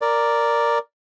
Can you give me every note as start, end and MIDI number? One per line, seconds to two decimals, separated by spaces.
0.02 0.78 70
0.02 0.78 74